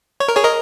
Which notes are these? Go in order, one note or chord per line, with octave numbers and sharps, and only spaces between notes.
C#5
A#4
G#4 C#5
A#4 D#5